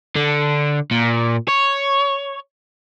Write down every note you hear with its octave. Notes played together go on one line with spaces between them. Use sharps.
D3
A#2
C#5